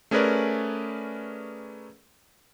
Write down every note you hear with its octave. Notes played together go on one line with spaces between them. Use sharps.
A3 C#4 G#4 A#4 B4 D5